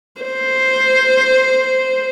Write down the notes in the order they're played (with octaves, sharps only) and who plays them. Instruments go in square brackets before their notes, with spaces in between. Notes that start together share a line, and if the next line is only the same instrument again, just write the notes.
[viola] C5